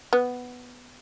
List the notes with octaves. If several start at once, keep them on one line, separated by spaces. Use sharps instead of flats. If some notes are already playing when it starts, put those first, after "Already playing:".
B3